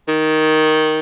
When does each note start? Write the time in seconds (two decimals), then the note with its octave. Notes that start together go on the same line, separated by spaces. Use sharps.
0.08 D#3